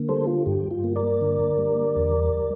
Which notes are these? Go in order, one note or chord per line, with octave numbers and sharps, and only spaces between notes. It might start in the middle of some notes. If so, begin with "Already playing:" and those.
Already playing: D3 A#3
G3 A4 C5
F4
G2 G4
F4
A#3
A#4 D5
D3
G3
E2